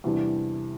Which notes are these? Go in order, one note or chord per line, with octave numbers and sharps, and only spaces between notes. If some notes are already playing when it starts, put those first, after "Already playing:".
E2 C3 E3 G3 D4